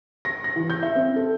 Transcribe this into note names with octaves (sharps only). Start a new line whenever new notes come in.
A#6
A#6
E3
G6
E5
C4
A4